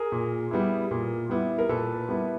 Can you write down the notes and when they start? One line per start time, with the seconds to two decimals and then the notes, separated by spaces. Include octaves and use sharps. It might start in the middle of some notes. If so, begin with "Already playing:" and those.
Already playing: G#4 A#4
0.12 A#2
0.51 G3 B3 E4
0.91 A#2
1.30 G3 B3 E4
1.59 A#4
1.69 A#2 A4 B4
2.09 G3 B3 E4